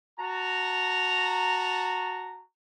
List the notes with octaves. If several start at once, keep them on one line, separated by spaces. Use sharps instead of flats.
F#4 A5 A#5